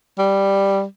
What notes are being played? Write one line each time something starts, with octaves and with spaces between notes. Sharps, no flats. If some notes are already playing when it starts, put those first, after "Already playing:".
G3